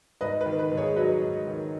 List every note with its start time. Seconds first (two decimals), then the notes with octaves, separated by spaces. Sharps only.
0.21 G#2 B4 D#5
0.41 B4
0.46 D#3
0.59 B4
0.72 G#2
0.77 G#4 C#5
0.96 F#3 B4 D#5
1.21 G#2
1.47 D#3